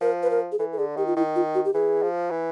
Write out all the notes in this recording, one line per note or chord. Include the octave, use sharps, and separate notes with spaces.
F3 A#4
B4
A#4
G#4
E3 A4
A4
D3 G#4
D#3 G4
F4
D#3 E4
F4
F#4
G4
E3 G#4
F3
E3